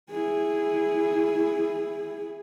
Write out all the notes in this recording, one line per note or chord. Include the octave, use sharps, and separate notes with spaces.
E4 G#4